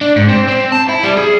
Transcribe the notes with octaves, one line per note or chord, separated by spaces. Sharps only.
D4
G#2
C4
C4
A5
E4
G3
G#4